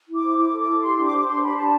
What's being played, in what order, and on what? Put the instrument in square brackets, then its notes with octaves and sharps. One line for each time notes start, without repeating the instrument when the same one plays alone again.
[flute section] E4
D6
C5
E4 D6
A4
D6
E4
G4 C6
D4
D6
C5
D6
D4 C6
G4 B5
D4 A5